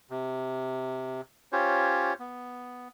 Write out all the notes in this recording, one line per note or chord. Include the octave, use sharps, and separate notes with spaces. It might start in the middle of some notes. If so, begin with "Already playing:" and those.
C3
C#4 F4 G4 C5 C#5
B3